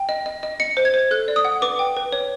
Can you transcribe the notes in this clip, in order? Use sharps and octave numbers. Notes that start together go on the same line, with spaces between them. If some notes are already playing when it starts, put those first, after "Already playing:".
Already playing: G5
D#5
D#5
D#5
D#5 C#7
C5
G#6
C5
A4 F#6
D5
D#6
F#5
B4 D6
G5
B4
C#5